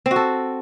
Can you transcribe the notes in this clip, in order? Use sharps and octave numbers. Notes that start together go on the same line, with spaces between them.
C4
F#4
A4